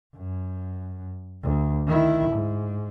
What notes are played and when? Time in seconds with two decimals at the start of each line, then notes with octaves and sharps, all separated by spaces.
0.16 F#2
1.43 D2
1.87 D#3 E4
2.31 G#2